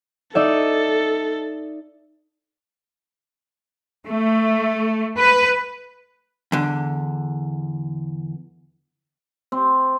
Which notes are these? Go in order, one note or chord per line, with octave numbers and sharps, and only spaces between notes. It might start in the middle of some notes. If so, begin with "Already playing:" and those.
D#4 A4 D5 E5
A3
B4
E2 D3
C4